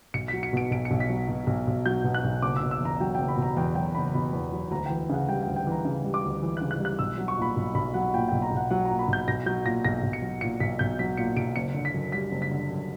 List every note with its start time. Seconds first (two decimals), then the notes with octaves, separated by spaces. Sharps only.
0.14 B1 C#7
0.28 F#3 B6
0.43 C#7
0.53 B2 D7
0.71 B1 D7
0.85 C#7
0.91 B1
1.00 B6
1.09 F#3
1.28 B2
1.47 B1
1.67 B1
1.86 F#3 G6
2.04 B2
2.14 F#6
2.24 B1
2.42 F#1 D6
2.56 E6
2.62 B2
2.71 E6
2.80 E2 A#5
3.00 F#3 G5
3.15 F#1 G5
3.28 B5
3.37 B2 A#5
3.56 E2 G5
3.75 F#3 G5
3.95 F#1 B5
4.14 B2 B5
4.33 E2
4.52 F#3
4.71 D2 A#5
4.86 E3 G5
5.09 C#3 F#5
5.29 G3 G5
5.43 D2 G5
5.56 G5
5.67 E3 A#5
5.85 C#3
6.04 G3
6.14 D6
6.24 D2
6.43 E3
6.57 C#3 F#6
6.71 F#6
6.80 G3
6.85 F#6
6.99 B1 E6
7.18 F#3
7.28 C#6
7.38 A#2 B5
7.57 B1
7.75 B1 B5
7.94 F#3 F#5
8.14 A#2 G5
8.28 B1 G5
8.42 A#5
8.52 B1
8.57 F#5
8.71 F#3 F#5
8.85 A#2 A#5
8.99 B5
9.08 B1 G6
9.28 B1 A#6
9.46 F#3 G6
9.65 A#2 A#6
9.85 B1 A#6
10.03 B1
10.13 C#7
10.22 F#3
10.41 A#2 C#7
10.60 B1 B6
10.79 B1 G6
10.99 F#3 B6
11.17 A#2 C#7
11.36 B1 D7
11.56 F#1 C#7
11.74 D3
11.85 B6
11.94 F#2
12.12 G3 B6
12.32 F#1
12.42 B6
12.51 D3
12.71 F#2